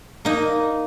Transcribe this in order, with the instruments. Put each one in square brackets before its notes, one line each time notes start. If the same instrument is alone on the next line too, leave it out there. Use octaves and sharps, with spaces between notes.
[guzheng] A#3 D#4